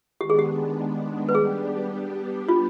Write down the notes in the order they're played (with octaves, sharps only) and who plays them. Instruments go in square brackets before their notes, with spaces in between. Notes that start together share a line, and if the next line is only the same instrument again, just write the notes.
[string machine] D#3 G#3 B3 D4 [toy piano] G4
[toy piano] G#4
G4
B4
[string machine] G3 B3 D4 G4 [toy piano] G#4
[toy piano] F4